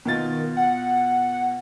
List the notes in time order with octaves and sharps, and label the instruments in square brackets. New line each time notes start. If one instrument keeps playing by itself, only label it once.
[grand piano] B2 F4 A6 [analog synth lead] D#3
[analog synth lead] F#5